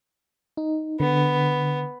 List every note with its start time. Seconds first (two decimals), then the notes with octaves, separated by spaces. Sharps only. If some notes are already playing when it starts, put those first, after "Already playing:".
0.57 D#4
1.00 D3 B3